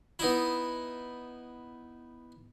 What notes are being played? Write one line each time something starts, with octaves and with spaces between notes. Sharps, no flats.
B3 D#4 E4